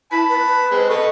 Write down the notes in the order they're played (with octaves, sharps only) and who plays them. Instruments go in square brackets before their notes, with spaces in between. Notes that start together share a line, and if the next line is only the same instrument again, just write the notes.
[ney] E4 [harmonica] A5 [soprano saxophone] B5
[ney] B4
[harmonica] G#3 C4
[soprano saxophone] A4 [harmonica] B4 D#5 C#6